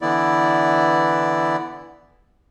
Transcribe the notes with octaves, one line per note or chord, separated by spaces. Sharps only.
D3 E3 B3 E4 D5